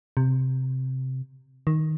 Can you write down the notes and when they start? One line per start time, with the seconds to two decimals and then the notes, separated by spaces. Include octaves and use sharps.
0.17 C3
1.67 D#3